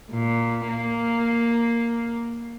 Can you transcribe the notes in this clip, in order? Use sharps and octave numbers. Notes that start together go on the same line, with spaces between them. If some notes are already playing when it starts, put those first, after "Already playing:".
A#2
A#3